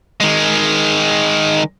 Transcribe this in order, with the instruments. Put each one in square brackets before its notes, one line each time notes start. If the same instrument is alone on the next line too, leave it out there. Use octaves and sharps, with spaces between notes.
[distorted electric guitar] D#3 G#3